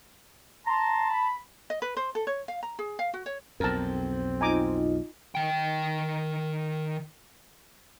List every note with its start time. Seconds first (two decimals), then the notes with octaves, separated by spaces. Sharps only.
0.66 A5 A#5 C6
1.10 B5
1.70 D#5
1.82 B4
1.97 C5
2.15 A4
2.27 C#5
2.48 F5
2.63 A#5
2.79 G#4
2.99 F5
3.14 F#4
3.26 C#5
3.60 B1 F2 C4 A#4 A5
4.41 D#4 F4 D#5 G#5 A#5 D6
5.35 D#3 G5